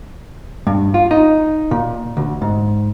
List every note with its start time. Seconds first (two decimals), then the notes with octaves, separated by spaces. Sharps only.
0.67 G2
0.94 F4
1.11 D#4
1.71 A#2
2.17 D2
2.42 G#2